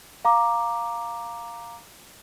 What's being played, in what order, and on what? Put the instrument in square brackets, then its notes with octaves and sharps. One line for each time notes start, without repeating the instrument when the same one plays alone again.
[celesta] F5 A#5 D6